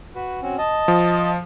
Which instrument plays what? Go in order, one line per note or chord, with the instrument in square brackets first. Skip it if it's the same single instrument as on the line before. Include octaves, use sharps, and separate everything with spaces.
[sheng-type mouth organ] F#4 B4
C4 C#4 F#4
D#5 A5
[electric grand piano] F3